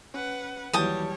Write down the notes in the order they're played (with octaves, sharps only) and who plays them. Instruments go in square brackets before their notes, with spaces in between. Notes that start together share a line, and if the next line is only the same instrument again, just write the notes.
[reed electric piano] C#4 [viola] B4 F#5
[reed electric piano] D#2 E3 F#3 [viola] G3 C#5 [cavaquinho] G5 A5 D#6